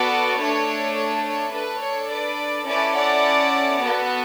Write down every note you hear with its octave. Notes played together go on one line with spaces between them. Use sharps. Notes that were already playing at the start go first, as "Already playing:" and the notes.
Already playing: B3 F#4 A4 B4 D5
A3 D4 A4 C#5
C#5
C#5
D4 A4 B4
C#5
B4 D5
C#4 E4 A4 B4 D5
D5 F#5
B3 F#4 A4